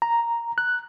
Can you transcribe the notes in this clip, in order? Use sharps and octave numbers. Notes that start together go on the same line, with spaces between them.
A#5
F#6